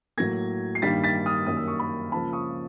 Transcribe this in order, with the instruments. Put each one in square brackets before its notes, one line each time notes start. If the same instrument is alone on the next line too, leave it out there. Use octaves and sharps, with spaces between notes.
[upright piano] A2 F#3 A#3 G#6 A#6
C7
G2 D#3 G3 A#3 A6 B6
A6 B6
D#6 F6
F#2 D#3 G3 A#3 D#6
E6
C#6 D#6
B5 C#6
C#2 C#3 F3 A#3 A5 B5
C#6 D#6